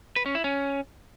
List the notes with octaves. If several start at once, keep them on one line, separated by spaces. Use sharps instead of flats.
B4
C#4
E4
C#4